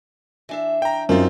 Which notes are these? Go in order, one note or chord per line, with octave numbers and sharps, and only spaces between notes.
E3 D4 E5
G5 A#5
F#2 C4 D#4 F4